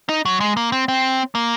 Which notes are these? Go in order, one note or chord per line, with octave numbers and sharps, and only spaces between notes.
D#4
F#3
G#3
A#3
C4
C4
A#3